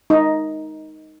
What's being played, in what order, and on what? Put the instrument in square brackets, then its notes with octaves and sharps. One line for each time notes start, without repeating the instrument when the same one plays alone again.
[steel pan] D#4